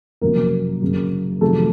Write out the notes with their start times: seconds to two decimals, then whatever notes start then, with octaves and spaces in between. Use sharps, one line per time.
0.22 F#1 F2 C3 F#3 A#3 A#4
0.81 F#1 F#2 C#3 F#3
1.41 F2 C3 D#3 F#3 A3 A4